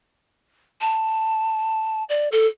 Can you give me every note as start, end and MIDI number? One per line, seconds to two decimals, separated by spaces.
0.81 2.04 81
2.09 2.29 74
2.32 2.47 69